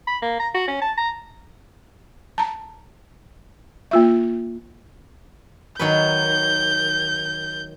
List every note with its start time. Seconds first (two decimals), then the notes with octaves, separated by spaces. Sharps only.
0.07 B5
0.22 A#3
0.40 A#5
0.54 F#4
0.68 C#4
0.81 A5
0.97 A#5
2.38 A5 A#5
3.91 A#3 F4 E5
5.79 D#3 F#3 B4 G6